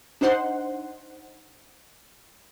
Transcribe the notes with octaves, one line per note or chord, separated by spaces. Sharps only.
D4 D#4 C5 F#5 C6